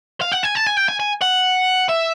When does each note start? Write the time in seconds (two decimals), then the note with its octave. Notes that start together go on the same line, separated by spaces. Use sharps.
0.22 F5
0.32 F#5
0.43 G#5
0.55 A5
0.66 G#5
0.77 G5
0.88 G#5
1.00 G#5
1.22 F#5
1.89 E5